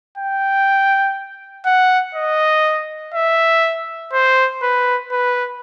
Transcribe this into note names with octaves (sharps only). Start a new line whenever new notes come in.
G5
F#5
D#5
E5
C5
B4
B4